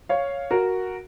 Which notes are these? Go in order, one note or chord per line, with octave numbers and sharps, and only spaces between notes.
C#5 F5
F#4 A#4